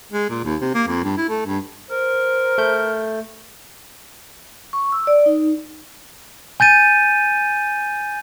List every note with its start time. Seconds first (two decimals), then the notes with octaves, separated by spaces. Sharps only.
0.12 G#3
0.30 A#2
0.44 D#2
0.61 C3
0.75 A#3
0.88 F2
1.04 G2
1.17 E4
1.29 A3
1.46 G2
1.91 A#4 C5
2.58 A3 G6
4.73 C#6
4.92 E6
5.07 D5
5.26 D#4
6.60 G#5 G6 A6 D#7